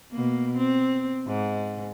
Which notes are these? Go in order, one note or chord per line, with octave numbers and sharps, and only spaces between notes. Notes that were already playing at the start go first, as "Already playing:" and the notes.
B2 A#3
C4
G#2